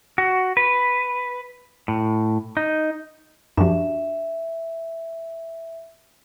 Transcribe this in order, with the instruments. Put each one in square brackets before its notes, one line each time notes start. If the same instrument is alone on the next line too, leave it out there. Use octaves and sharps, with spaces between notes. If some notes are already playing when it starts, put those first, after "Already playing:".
[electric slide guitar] F#4
B4
A2
D#4
[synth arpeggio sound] F#2 F3 [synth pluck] D4 F#4 G4 [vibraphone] E5